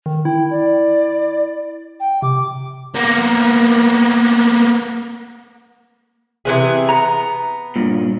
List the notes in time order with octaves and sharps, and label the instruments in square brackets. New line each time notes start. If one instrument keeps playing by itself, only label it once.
[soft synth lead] D#3
[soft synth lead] E4 [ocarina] G5
[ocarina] D5
G5
[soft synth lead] C3 [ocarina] D6
[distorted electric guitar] A#3 B3
[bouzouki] C3 E3 G#4
[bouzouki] B3 [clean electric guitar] A#5
[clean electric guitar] G2 A#2